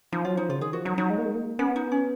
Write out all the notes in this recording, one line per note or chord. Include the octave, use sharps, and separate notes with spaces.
F3 D#4
F#3 F4
F3 D#4
C#3 F4
D#3 G#4
F3 F#4
F#3 D#4
F#3 D#4
G#3
A#3
G#3
A#3
B3 C#4
D#4
C#4